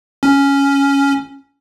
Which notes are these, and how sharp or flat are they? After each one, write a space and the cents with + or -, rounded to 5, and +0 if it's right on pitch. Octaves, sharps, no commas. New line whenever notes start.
C#4 +5